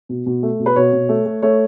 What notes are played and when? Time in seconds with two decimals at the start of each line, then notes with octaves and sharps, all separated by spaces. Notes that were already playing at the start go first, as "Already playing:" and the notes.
0.09 B2
0.26 B2
0.43 A3
0.59 B2
0.66 B4
0.76 B2 C#5
0.93 B2
1.09 A3
1.26 A3
1.42 A3 C#5